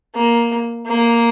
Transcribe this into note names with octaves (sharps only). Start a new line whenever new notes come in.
A#3
A#3